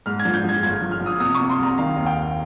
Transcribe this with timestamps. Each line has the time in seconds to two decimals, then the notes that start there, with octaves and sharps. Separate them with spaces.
0.06 G#2 F6
0.20 G#6
0.25 F3
0.34 G6
0.44 F3 G#6
0.63 G1 G#6
0.81 F3
0.91 F6
1.00 F3
1.06 D#6
1.20 C3 D#6
1.35 C#6
1.40 C3
1.49 C6
1.58 C2 A#5
1.78 D#3 F5
1.97 D#2
2.06 G5
2.16 D#2